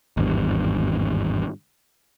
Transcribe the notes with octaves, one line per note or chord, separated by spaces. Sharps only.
G#1 E2 G2